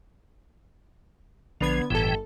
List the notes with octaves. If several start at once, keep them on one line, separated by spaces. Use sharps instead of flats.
A#1 D3 F3 B3 G#6
G1 A2 E3 A4 G5